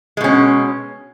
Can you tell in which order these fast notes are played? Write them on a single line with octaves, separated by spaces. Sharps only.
G#3 B2 C#4